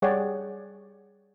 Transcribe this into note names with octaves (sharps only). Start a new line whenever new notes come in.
G3 G#4 C#5 D5 F#5 G5